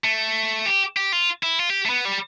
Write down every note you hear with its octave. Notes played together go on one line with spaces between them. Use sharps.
A3
G4
G4
F4
E4
F4
G4
A3
B3
G3